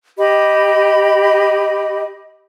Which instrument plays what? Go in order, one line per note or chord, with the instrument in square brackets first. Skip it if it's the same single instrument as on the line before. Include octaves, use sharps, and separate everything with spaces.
[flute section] G4 D#5 B5